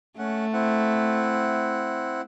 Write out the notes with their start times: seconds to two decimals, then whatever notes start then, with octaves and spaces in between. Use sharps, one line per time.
0.18 A3 C#4 F#5
0.53 C4 E4 F#5